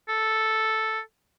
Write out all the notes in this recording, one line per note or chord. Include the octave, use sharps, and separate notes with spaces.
A4